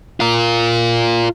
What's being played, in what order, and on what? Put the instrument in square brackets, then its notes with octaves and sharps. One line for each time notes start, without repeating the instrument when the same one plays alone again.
[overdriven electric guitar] F4 A#4